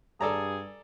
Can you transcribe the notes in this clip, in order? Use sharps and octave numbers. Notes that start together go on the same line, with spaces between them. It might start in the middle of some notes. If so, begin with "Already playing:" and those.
G2 G#4 A4 D5 A#5